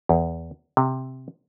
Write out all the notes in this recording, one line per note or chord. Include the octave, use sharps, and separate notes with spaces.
E2
C3